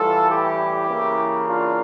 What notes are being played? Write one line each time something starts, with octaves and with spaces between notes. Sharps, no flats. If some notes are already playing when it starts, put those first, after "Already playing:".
Already playing: A2 E3 G3 F4 A4
E4 G4
C#3 E3 A#3
D4 F4